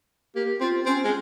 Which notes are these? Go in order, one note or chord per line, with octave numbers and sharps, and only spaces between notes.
A#3 G4
C4 F4
C4 C#4
G#3